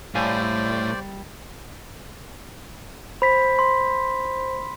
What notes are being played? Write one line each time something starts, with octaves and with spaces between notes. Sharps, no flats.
A2 G3 C5 D5 F5 G#5
C5 B5 B6
C6